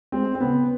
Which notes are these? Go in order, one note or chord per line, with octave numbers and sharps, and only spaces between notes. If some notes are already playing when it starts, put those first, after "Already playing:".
G#3 C4
C4
C#3 B3